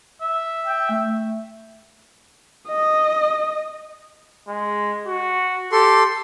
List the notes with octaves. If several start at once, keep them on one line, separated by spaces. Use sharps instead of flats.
E5
G5
A3
D#5
G#3
F#4
G4 A4 C6